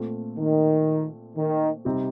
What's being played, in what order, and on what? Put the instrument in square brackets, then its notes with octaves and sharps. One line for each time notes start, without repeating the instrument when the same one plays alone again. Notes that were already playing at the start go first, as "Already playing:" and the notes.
Already playing: [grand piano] A#2 A3 C4 F4 A4
[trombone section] D#3
D#3
[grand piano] C3 G3 C4 D#4